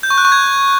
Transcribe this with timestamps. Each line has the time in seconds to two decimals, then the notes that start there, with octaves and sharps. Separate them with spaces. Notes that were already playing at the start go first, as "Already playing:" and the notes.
0.03 G6
0.10 C#6
0.18 F#6
0.25 C#6
0.32 G#6